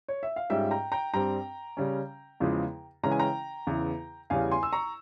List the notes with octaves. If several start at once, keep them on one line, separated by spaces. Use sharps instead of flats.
C#5
E5
F5
G#2 G3 C#4 F4 E5 G5
G5 A#5
G5 A#5
G2 G3 C4 G5 A#5
C#3 G3 C#4
E2 C#3 F3 G#3
C#3 E3 G#3 C#4 A#5
G#5
G5 A#5
E2 C#3 E3
E2 C#3 G3 C#4 F5 G#5
G#5 C6
E6
A#5 C#6